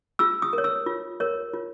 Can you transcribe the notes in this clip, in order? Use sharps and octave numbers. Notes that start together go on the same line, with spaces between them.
F4 E6
D#6
A#4
C#5
E6
F4
A#4 C#5
F4